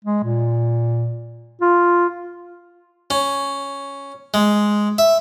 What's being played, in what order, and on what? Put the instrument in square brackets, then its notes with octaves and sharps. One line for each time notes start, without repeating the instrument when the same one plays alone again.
[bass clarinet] G#3
A#2
F4
[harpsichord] C#4
G#3
E5